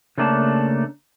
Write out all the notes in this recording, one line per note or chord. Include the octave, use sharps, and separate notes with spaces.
C#3 A3 A#3 D4 G#5 A5